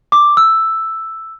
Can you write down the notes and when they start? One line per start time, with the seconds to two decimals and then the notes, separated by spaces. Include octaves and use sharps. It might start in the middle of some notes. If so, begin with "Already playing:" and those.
0.12 D6
0.37 E6